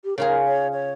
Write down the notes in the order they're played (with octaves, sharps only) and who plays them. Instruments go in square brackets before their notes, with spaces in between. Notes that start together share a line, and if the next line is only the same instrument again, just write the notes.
[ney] G4
[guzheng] C#3 F4 G#4 [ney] A#4
[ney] C#5
C#5